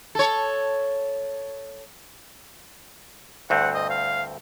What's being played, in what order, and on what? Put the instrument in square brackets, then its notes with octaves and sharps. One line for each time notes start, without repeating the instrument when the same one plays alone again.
[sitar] A4 C#5
[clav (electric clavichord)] D2 G2 C4 [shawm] F#5
[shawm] D#5
F5